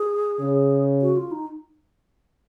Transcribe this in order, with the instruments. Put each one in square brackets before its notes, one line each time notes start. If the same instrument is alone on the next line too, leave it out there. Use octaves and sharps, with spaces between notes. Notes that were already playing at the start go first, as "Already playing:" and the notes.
Already playing: [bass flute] G#4
[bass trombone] C#3
[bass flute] F#4
F4
D#4